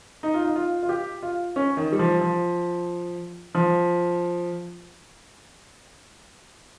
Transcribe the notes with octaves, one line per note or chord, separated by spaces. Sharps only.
D#4
F4
D#4
F4
F4
G4
F4
C#4
D#3
G3
F3
F3
F3